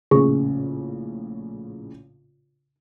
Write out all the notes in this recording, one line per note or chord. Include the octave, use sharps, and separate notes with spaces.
A#1 A2 C#3 G#4 C#6